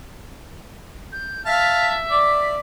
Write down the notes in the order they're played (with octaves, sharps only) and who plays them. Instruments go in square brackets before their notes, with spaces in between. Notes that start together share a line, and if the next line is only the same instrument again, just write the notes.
[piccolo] G6
[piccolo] E5 [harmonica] F5 A5
[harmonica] D5